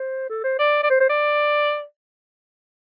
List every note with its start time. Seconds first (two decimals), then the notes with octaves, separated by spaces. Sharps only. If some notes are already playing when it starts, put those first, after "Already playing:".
Already playing: C5
0.29 A4
0.44 C5
0.59 D5
0.83 D5
0.90 C5
1.00 C5
1.09 D5